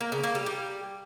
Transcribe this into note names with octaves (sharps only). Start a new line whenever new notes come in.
A#3
C#3
A#3
G3
G3